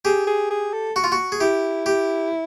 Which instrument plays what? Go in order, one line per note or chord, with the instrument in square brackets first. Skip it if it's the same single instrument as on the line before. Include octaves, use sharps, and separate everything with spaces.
[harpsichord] G4 [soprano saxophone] G#4
[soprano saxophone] G#4
G#4
A4
[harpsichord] F#4
F4
F#4
G#4
[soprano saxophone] E4 [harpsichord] G4
[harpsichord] G4